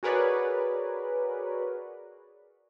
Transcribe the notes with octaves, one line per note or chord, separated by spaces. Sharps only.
F#4 G#4 A#4 B4 C#5 D5